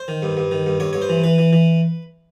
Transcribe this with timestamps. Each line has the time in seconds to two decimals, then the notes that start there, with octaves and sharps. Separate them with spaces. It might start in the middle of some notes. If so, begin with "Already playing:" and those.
Already playing: C5
0.08 D#3
0.22 G2
0.37 G2
0.51 D#3
0.66 G2
0.80 G2 C#5
0.93 G2 C#5
1.02 C5
1.09 E3
1.24 E3 B4
1.38 E3
1.53 E3